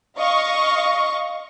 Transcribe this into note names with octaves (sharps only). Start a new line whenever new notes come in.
D#5 F5 C#6